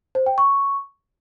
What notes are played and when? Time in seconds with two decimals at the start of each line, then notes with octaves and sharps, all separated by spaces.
0.15 C5
0.26 G5
0.38 C#6